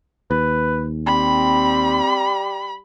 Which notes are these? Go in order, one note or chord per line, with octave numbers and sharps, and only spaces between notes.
D#2 B4
G3 C4 B5